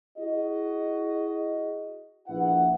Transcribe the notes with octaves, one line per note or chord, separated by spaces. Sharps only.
E4 F#4 G#4 D#5
A#1 E4 B4 F#5